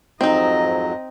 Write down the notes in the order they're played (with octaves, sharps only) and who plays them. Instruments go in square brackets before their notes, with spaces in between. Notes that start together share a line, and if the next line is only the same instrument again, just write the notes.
[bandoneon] F2 G#2 F#3 [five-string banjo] C4 D#4 [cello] D#5